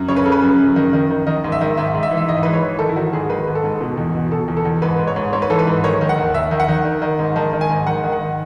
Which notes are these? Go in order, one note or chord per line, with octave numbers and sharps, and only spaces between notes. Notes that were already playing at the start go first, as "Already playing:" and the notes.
Already playing: F#2
C#3 C#5
B4
C#3 A4
B4
F#2
F#2
D#3
D#3
D#3
D#3 D#5
G#2
E5
D#3
G#2 E5
G#2
E5
E3
E5
G#2 D#5
E3 B4
C#5
E3
D#3 A4
E4
D#3 F#4
G#2 G#4
D#3 B4
G#2
A4
G#2
B2
E2
B2
B2 A4
E2
A4
E2
G#2 B4
G#2
C#5
G#2
G#2 C#5
B4
E3 A4
B4
G#2
D#3 C#5
D#3
F#5
D#2
D#2 E5
D#3
F#5
D#3
D#3
D#3
G#2
D#3 A5
D#3
G#5
G#2
D#3 F#5
D#3
F#5